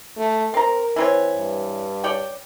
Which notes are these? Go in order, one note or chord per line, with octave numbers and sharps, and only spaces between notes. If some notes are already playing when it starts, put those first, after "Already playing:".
A3
C4 A#4 A#5
E3 C4 C#5
G2
C#5 D5 G5